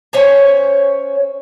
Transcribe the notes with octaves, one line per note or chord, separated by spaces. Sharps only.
C#4 C5 C#5 G#5